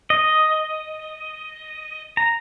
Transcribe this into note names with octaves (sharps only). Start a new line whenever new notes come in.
D#5
A#5